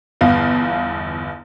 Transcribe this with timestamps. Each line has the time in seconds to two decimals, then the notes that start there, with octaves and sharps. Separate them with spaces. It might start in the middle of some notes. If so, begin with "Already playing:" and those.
0.21 G1 E2 B3 F5